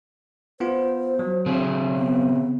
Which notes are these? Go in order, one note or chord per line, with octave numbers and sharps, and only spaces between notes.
B3 F4 C5
F#3
C#3 C4 G#4
B3